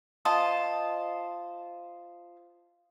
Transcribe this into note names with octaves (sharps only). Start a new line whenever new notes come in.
F4 C5 D#5 A5